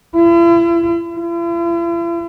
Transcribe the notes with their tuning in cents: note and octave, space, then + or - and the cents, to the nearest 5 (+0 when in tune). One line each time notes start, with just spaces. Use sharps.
E4 +40
E4 +45